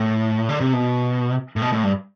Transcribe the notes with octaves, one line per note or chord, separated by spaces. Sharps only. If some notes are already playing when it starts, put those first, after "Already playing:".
Already playing: A2
D3
C3
B2
A2
B2
A2
G2